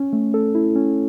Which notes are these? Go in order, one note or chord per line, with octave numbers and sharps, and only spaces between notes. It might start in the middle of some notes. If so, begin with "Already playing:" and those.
Already playing: C#4
A3
A4
E4
C#4